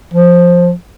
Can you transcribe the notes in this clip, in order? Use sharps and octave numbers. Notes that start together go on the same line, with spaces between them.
F3